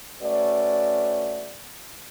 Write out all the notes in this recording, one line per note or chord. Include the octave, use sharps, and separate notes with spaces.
A3 C#4 F#4 B4 D5